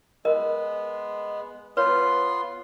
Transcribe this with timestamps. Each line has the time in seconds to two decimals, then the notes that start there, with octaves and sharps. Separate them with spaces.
0.25 G#3 B3 A#4 D#5
1.77 B3 F4 B4 C#5 C6